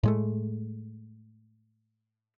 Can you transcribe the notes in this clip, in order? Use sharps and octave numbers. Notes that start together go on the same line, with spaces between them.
A2 G#3 A3